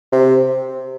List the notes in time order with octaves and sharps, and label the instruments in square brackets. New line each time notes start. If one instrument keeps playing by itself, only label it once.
[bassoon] C3